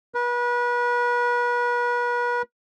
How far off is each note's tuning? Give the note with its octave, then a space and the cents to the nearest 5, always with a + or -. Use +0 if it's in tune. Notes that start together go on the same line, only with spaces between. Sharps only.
B4 -35